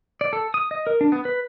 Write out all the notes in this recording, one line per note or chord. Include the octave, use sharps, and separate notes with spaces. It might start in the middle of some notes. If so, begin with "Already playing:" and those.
D5
A4
D#6
D#5
A#4
D4
B3
B4